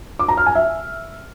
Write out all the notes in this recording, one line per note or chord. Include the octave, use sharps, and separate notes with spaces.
D6
A#5
F6
G#5
E5